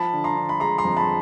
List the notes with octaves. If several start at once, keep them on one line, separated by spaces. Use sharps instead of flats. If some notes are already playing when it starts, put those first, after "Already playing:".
Already playing: F3 A5 B5
D3
A#5 C6
D3
B5
G#3 A#5 C6
A#5 C6
F2
A5 B5